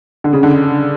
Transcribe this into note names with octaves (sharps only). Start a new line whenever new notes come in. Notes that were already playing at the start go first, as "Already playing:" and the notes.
D3
C#3
D3